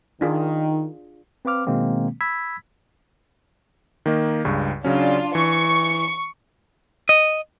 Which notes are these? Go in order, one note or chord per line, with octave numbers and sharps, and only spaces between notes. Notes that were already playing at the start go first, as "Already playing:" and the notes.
D#3 D4 F4 G#4
C4 B4 F5 D6 F6
B2 D#3 G#3 A#3 C4
B5 E6 G#6 B6
D#3 A#3 D#5
C#2 G2 C#3
C#3 F#3 C#4 D4 F4
E3 C#6
D#5